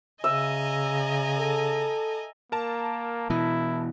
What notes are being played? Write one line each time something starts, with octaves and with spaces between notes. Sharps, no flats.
C#3 D#5 E5 G#5 A#5
A4
A#3 A#4 A5
B2 E3 E4